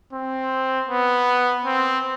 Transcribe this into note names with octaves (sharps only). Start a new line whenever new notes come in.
C4
B3
C4